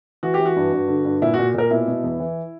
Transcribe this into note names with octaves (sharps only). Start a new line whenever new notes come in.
E3 F#4
G4
E3
F#4
G2
G2
D3
G2
A#2 E4
A#2 F#4
A#2 A#4
B2 E4
B2
E2
E3